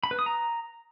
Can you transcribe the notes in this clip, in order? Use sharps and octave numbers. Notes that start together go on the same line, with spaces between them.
B5
B4
D#6
A#5